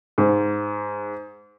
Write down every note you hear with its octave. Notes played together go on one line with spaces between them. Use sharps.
G#2